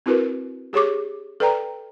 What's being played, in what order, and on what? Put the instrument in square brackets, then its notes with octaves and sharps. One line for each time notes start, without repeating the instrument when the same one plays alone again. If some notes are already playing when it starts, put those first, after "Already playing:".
[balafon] C4 E4 F#4 A#4 B4
G4 G#4 C#5 C#6 D6
A4 B4 D5 G5 A#5